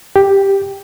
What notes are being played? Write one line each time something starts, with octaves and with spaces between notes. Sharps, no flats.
G4